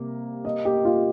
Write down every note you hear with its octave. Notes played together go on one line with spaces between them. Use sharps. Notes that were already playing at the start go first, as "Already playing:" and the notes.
Already playing: C3 G3 A#3
D#5
G4
F4